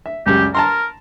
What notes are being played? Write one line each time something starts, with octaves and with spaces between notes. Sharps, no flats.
E5
C#2 F#2 G3 G4
A#4 A5 A#5 C6